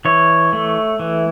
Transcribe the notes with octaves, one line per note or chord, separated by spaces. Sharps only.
E3 C#5
A3
E3